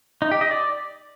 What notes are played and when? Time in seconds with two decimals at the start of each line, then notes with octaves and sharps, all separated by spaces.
0.22 D#4
0.31 G4
0.41 D#5
0.51 D5